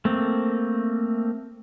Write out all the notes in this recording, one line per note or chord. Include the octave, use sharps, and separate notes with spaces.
A3 A#3 C4